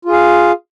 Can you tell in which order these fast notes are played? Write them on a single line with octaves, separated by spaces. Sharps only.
F4 G#4 F5